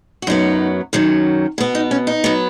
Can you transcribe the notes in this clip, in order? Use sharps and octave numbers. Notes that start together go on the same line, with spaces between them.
F#4
F#2 F#3 B3 D#4
F#2 D#3 F#3 C#4
B2 B3
D#4
C#4
D#4
F#3 B3